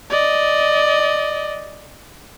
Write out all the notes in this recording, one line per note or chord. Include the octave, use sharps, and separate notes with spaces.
D5 D#5